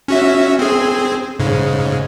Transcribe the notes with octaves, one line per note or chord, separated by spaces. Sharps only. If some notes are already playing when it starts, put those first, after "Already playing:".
C#4 F#4 E5
C4 G#4
G#2 C#3